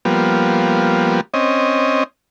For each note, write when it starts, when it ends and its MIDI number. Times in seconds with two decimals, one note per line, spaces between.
0.05 1.21 53
0.05 1.21 55
0.05 1.21 58
0.05 1.21 59
1.34 2.04 60
1.34 2.04 61
1.34 2.04 75